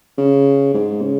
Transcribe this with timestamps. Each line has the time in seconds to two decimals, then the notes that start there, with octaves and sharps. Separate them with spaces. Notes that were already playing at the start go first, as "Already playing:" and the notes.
0.18 C#3
0.74 G#2
1.02 C#3